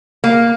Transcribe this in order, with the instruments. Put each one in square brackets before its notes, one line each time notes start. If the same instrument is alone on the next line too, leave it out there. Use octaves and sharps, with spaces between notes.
[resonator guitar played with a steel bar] A#3